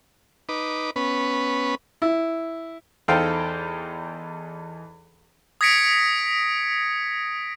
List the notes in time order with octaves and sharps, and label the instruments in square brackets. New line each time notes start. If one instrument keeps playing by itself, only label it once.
[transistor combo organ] D#4 B4 D6
B3 C#4 B4
[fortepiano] E4
E2 D#4 A4 C5 F5 G5
[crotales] D#6 G#6 A#6 B6 C#7 D7